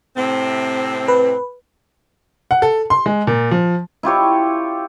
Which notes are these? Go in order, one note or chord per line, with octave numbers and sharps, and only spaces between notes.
A2 C3 C4
B4
F#5
A4
C6
G#3
A#2
F3
E4 F4 G4 C#5